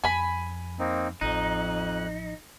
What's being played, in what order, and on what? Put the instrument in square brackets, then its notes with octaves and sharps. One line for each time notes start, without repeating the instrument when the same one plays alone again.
[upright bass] F2 [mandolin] G#5 B5
[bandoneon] A#3 C4 D#4
[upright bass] A1 F3 [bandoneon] F2 F#6 [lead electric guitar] D#4